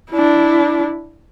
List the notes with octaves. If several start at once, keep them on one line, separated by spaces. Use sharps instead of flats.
D4 E4